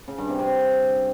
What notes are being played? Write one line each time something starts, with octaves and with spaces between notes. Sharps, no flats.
C#3
G2
C3
C3